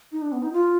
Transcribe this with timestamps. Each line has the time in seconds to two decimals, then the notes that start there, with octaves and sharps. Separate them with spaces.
0.12 D#4
0.22 D4
0.32 B3
0.43 D#4
0.53 F4